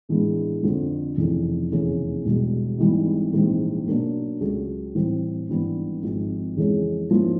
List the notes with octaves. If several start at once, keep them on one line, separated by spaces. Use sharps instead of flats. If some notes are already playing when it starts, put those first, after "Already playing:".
A2 E3 G#3 B3 D4
F2 D3 F3 A3 C4
F1 F2 C#3 E3
F1 E2 C#3 E3 A3
E1 E2 B2 G3
G#1 G#2 E3 G3 B3
A#1 G#2 E3 G3 C4
B1 B2 F#3 A#3 D4
C#2 C#3 F#3 A3
A2 E3 G3 C4
G#1 G2 E3 G3 B3
G#1 G#2 F3
F2 C#3 E3 G#3 C#4
G#2 F3 A#3 C#4 E4